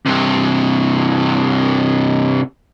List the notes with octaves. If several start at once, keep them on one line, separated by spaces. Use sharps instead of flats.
G2 C3